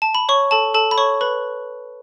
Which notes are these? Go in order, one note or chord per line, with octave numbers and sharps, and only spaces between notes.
A5
B5
C#5 C#6
A4 A5
A4 A5
B5
C#5 C#6
B4 B5